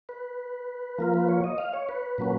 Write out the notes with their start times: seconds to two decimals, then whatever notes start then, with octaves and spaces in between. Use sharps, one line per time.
0.09 B4
0.99 F3 A#3 F4 A#4
1.14 B4
1.28 C#5
1.44 D#5
1.58 F5
1.73 C#5
1.89 B4
2.18 A#2 F#3 A#3 C#4